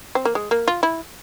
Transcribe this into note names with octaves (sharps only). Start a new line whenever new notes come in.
C4
A#3
G#3
A#3
F4
E4